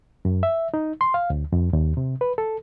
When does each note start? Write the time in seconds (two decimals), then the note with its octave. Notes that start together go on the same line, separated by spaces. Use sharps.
0.25 F#2
0.43 E5
0.74 D#4
1.01 C6
1.14 F5
1.30 D2
1.52 F2
1.73 D#2
1.97 C3
2.21 B4
2.38 A4